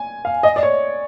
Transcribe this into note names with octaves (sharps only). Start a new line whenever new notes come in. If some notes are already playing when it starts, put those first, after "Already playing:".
Already playing: G#5
F5
D#5
D5
C#5